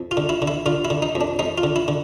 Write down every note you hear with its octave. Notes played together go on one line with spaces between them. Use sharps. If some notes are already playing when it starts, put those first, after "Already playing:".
Already playing: F2
F4
D3
E4
D3
E4
D3 F4
E4
D3
D#4
F2
D4
F2 D#4
F4
D3
E4
D3